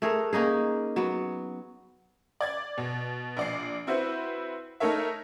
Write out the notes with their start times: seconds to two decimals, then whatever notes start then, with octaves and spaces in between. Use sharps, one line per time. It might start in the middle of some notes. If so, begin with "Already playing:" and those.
0.02 A3 G#4 A#4
0.33 A#3 C#4 D#4 G#4
0.96 F#3 B3
2.41 D5 G#6 A6
2.78 B2
3.37 A#1 D5 C7
3.87 C4 E4 F#4 B4 C5
4.80 A3 D#4 A4 A#4 C#5 E5